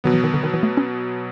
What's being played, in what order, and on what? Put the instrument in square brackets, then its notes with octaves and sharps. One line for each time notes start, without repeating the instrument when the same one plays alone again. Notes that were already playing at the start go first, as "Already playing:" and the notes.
[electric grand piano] B2 F#3 B3 [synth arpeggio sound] D#3
[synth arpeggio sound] E3
D#3
D3
D#3
E3
A3
C#4